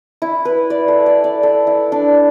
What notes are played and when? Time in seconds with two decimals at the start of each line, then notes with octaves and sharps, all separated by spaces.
0.22 E4
0.45 B4
0.70 D5
0.88 A4
1.06 D5
1.24 D5
1.43 A4
1.67 E4
1.92 D4